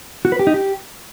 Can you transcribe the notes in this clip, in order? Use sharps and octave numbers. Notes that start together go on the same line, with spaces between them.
F#4
B4
G4
D#4
G4